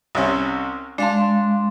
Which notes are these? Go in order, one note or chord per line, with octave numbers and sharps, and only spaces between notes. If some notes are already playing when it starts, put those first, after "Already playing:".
C2 C3 C#4
G#3 D4 F5 A5 C6